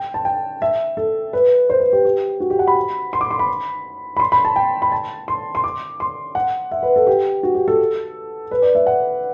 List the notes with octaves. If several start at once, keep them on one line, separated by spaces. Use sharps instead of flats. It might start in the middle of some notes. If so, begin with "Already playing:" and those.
Already playing: G5
A5
G5
E5
A4
B4
C5
B4
G4
G4
F#4
G4
F#5
B5
C6
D6
C6
B5
B5
C6
B5
A5
G5
B5
A5
C6
C6
D6
C6
F#5
E5
B4
A4
G4
F#4
G4
A4
B4
D5
E5
F#5